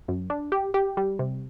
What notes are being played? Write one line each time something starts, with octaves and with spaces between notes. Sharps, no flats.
F#2
D4
G4
G4
G3
C3